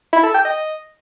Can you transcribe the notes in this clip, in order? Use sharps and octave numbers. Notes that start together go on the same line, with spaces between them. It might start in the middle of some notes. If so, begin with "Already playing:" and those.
E4
A4
G5
D#5